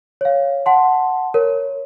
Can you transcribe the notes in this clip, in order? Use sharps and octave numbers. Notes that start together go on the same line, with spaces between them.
C#5 F5
F#5 A5 C6
A#4 C#5